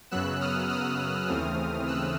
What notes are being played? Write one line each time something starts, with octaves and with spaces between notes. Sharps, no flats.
F#2 C#3 F#3 B3 E6 F#6
D#6 F6
D#6 F6
D#2 C#3 E3 A3 C4 D#6 F6
E6 F#6